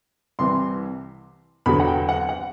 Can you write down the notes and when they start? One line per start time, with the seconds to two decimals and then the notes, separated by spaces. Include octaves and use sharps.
0.39 C2 C3 E3 C6
1.66 E2 D3 F#3 B5
1.80 F#5
1.87 G5
2.09 F#5
2.29 F#5